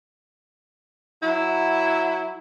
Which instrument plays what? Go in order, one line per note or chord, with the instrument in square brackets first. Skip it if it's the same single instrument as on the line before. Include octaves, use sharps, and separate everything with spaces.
[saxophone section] F#3 E4